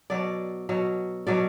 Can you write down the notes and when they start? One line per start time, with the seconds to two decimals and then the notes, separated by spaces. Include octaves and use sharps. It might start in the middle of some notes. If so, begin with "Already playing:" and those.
0.10 B2 F#3 D5
0.69 B2 F#3
1.27 B2 F#3 D5